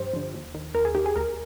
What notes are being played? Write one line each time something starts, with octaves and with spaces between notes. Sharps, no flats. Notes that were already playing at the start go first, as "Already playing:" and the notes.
Already playing: G2 F3 G4 C5
D3 F3
D#2
D#3
D#2 A#4
G#4
D#3 G4
G#4
D2 A#4